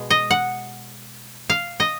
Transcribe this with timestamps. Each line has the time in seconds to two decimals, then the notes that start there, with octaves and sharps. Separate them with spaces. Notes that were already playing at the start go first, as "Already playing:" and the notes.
Already playing: B2 G#3
0.10 D#5
0.31 F#5
1.50 F5
1.80 D#5